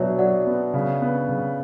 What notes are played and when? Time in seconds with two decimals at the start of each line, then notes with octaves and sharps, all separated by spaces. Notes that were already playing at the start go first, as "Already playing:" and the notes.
Already playing: B2 F#3 B4 C#5 D5 E5
0.18 F#3 D5 F#5
0.46 B3
0.74 C#3
1.02 B3
1.29 C#3